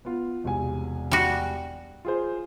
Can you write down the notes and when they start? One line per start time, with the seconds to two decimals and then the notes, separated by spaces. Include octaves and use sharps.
0.05 B3 F4
0.44 E1 C2 G#5
1.12 G3 F#4
2.05 F4 G#4 C5